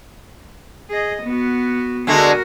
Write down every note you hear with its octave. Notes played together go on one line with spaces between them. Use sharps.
G#4 D#5
B3 F#4
D3 G#3 A3 F#4 A#4